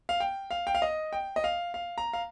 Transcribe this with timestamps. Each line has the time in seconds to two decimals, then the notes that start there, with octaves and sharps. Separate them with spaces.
0.09 F5
0.20 G5
0.51 F5
0.67 G5
0.75 F5
0.82 D#5
1.13 G5
1.36 D#5
1.44 F5
1.74 F5
1.98 A#5
2.13 F5